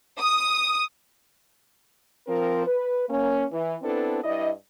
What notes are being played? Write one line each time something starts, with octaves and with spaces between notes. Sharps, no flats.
D#6
F3 C4 A#4
B4
A#3 C#4
E3
B3 C4 D4 E4 A4 B4
G2 E4 D5 D#5